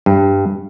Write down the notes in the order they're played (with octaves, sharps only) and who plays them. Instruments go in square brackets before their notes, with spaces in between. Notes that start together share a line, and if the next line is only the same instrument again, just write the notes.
[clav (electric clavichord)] G2